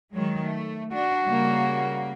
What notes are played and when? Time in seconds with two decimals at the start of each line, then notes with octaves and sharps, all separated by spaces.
0.13 D#3 F#3 G#3
0.43 A3
0.94 D4 F#4
1.25 C#3 G3 A#3